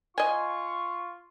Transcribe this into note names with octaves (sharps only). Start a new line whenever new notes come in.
F4 D#5 G#5 C#6